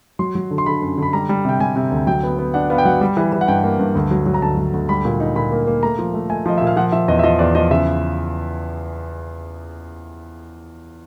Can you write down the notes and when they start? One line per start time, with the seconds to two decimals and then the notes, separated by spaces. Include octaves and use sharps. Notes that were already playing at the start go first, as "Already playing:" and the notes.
0.19 F#3 C6
0.35 F#3
0.51 D3
0.58 C6
0.66 D3 B5
0.82 F#2
0.98 D3 B5
1.13 G3 A#5
1.29 G3
1.45 C3 G5
1.60 G3 G#5
1.76 C3
1.92 D2
2.07 F#3 G5
2.23 B3
2.38 B3
2.54 D4 F#5
2.70 B3 F5
2.78 G5
2.85 F#3 F#5
3.01 G3
3.17 E3
3.32 E3
3.41 F#5
3.48 G2 G5
3.64 A#3
3.79 G2
3.95 D2
4.11 F#3
4.26 F#3
4.34 A#5
4.42 D2 A5
4.57 F#3
4.73 D2
4.89 G3 B5
5.05 A#2
5.20 D#4
5.36 A#2 B5
5.52 A#3
5.67 A#3
5.83 A3 A#5
5.99 F3
6.14 A3
6.30 A3 G#5
6.46 F3 D#5
6.58 A#2 E5
6.67 F5
6.77 F3 F#5
6.92 F3 E5
7.08 E2 D#5
7.19 E5
7.23 F3 D#5
7.39 E2 D5
7.55 F3 D#5
7.70 C#3 E5